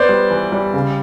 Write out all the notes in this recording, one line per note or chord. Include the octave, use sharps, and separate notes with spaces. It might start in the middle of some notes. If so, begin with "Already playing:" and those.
Already playing: B3 C5 D5
G3
E3
G3
C#3